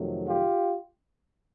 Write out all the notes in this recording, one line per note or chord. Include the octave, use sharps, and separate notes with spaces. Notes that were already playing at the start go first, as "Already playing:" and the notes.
Already playing: F2 C3 D#3 F#3 A3
F4 G4